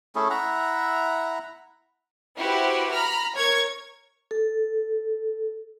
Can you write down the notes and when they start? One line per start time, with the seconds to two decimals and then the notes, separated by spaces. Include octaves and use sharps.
0.15 A3 C#4 E4 G#4
0.30 E4 E5 F#5 A#5
2.38 E4 F#4 G4 B4 C5
2.90 A#5 B5 F6
3.36 A#4 C#5 C#6 G#6
4.31 A4